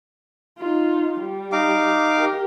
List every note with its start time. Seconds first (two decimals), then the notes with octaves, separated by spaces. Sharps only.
0.58 D#4 F4
1.20 G3
1.52 D#4 F5 D6
2.16 G4 A#4